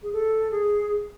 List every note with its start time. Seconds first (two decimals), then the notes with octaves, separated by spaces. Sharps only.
0.03 G#4
0.13 A4
0.51 G#4